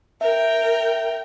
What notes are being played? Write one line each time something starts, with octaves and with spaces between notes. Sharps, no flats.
A#4 E5 G5